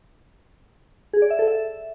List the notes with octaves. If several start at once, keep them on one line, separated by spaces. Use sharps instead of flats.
G#4
D5
E5
A4
E5